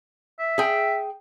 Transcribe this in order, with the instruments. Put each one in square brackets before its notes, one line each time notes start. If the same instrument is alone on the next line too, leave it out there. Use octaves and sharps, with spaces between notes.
[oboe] E5
[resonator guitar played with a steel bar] G#4 G5